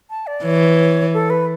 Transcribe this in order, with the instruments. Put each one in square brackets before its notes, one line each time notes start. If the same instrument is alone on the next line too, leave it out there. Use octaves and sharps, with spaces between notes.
[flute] A5
D5
[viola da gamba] E3 [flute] C#5
[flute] A4
B4